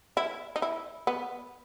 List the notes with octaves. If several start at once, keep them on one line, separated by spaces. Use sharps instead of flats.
E4
D#4
E4
B3